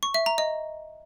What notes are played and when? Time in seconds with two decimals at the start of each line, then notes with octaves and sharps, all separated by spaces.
0.03 C#6
0.14 E5
0.26 A#5
0.38 D#5